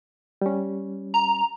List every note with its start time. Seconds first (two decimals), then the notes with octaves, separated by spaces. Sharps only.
0.41 G3 C#4
1.14 A#5